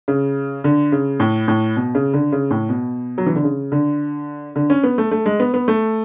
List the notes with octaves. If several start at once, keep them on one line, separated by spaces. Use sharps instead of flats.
C#3
D3
C#3
A2
A2
B2
C#3
D3
C#3
A2
B2
F#3
E3
D3
C#3
D3
D3
C#4
B3
A3
A3
G#3
B3
B3
A3